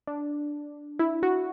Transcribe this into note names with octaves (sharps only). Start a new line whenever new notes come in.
D4
E4
F#4